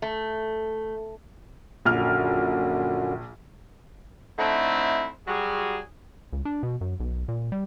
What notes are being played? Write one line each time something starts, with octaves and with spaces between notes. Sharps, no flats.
A3
A#1 F#2 D3 F6
D3 A3 C4 D#4 E4
F#3 G3 F#4 G#4
C#2
D4
B2
F#2
B1
A#2
G3